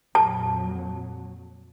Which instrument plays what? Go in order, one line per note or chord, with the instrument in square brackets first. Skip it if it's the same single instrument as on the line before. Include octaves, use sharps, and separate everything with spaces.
[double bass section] F2 A#2 F#3 [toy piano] A5